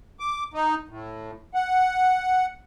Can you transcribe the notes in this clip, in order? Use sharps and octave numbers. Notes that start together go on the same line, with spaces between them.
D6
D#4
A2
F#5